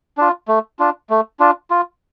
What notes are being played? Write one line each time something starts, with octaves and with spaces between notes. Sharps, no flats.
D4 F4
A3
D4 F4
A3
D4 F4
F4